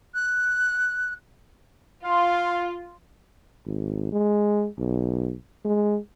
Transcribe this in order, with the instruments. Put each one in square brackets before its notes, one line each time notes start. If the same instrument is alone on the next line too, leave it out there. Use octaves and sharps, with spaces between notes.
[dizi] F#6
[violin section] F4 [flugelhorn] F5 [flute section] C6
[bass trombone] G#1
G#3
B1
G#3